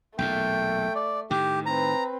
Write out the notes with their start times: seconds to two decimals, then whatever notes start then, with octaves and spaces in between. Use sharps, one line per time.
0.19 B1 E2 A#2 A3 G5
0.95 D5
1.31 A2 D#3 G4
1.66 C4 B4 A#5